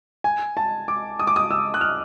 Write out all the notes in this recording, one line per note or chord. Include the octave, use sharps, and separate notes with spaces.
G#5
A5
D6
D#6
D6
D#6
E6
F#6
F6